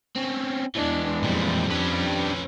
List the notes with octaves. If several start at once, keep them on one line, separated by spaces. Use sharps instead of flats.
C4 C#4
E2 E3 G#3 D4
F2 A#2 G3
C#4 D4 G4 B4